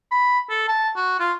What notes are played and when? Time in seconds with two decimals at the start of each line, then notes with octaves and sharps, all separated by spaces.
0.11 B5
0.50 A4
0.69 A5
0.96 F#4
1.20 F4